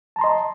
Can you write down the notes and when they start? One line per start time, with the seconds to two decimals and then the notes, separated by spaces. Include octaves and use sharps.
0.16 A5
0.19 A#5
0.21 C6
0.24 D#5